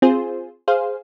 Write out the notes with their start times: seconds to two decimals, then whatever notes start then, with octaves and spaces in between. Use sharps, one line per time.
0.02 C4 F4 G#4 C5
0.68 G#4 C5 F5